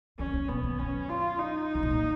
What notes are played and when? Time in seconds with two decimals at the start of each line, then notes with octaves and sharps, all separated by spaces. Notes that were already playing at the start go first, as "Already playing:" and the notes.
0.19 D#3 C#4
0.34 C#3
0.49 B2 B3
0.63 D#3
0.79 F#2 C#4
1.09 F4
1.39 D#4
1.75 C#3
1.83 B2
1.91 A#2